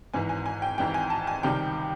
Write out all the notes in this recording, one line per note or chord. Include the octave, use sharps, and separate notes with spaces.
G#1 G#2 E3 G#5
G#5
G#5
G5
G#1 G#2 E3 G5
G#5
A5
G#5
C#2 C3 D#3 G3 G5